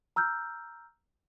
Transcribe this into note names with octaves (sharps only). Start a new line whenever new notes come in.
A#5 E6 F6 G6